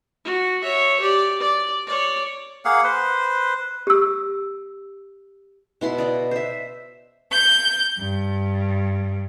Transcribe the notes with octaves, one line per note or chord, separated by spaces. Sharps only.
F#4
C#5 E5
G4 D5
D5
C#5 D5
A#3 G#4 F5 F#5
B4 C5
G4 E6
B2 E4 C6
D5 D#5
C5 E5
G6
G2